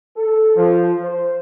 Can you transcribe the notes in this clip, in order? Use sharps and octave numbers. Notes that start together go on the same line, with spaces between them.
A4
F3
C5